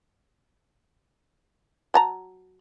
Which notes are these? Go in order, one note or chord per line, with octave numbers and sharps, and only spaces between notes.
F#3 A5 A#5